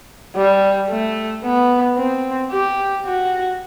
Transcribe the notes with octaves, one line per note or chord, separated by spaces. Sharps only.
G3
A3
B3
C4
G4
F#4